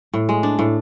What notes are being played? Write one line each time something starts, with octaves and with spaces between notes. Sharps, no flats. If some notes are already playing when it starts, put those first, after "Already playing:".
A2
G#3
D4
A2